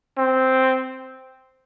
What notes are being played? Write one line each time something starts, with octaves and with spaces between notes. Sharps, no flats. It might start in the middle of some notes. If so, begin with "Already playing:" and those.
C4